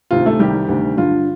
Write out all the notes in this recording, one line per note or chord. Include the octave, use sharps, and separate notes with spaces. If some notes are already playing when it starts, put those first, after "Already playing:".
D2 C3 D#3 F4
A3 A4
C2 C3 D#3 G3 G4
D2 C3 D#3
G2 D3 F4